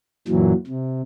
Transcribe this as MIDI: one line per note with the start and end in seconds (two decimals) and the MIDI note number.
0.28 0.53 42
0.28 0.53 46
0.28 0.53 52
0.28 0.53 54
0.67 1.02 48